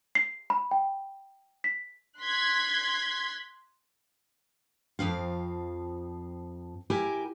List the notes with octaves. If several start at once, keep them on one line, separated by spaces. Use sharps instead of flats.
C7
B5
G5
B6
C6 F#6 G#6 B6
F2 F3 C4 F5
E4 G4 A#4 G#5